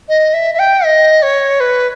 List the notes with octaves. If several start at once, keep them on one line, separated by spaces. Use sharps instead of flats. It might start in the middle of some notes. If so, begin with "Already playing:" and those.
D#5
E5
E5
G5
D#5
C#5
B4